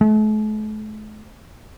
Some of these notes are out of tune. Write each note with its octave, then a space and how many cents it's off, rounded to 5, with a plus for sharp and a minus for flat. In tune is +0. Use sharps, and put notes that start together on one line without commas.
A3 -45